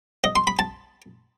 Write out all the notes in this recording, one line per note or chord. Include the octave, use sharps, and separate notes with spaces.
D#5
C6
B5
A5